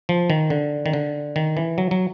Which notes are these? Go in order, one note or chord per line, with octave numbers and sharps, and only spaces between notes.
F3
D#3
D3
D#3
D3
D#3
E3
F#3
F#3